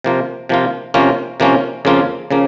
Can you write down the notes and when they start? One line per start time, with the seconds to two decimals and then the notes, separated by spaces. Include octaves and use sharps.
0.04 C3 F3 A#3 F4
0.49 C3 F3 A#3 F4
0.94 C3 F3 A#3 C#4 F4
1.40 C3 F3 A#3 C#4 F4
1.85 F2 C#3 F3 A#3 F4
2.31 C#3 F3 A#3